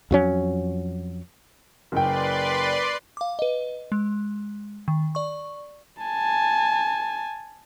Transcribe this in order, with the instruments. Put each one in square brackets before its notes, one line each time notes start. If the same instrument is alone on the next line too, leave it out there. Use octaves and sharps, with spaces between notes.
[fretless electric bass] F2 F#3 C#4
[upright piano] F#1 G5 [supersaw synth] B4 D5 C6
[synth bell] F5 D6
B4 D#5
G#3
D#3
D5 C#6
[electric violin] G#5 A5